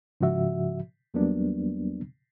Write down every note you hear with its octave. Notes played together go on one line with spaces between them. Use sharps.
G#2 C#3 F3 F#4 E5
E2 F#3 G3 A#3 B3 D4